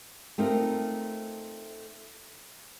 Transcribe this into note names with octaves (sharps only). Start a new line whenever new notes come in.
A3 C4 D#4 F4 A#4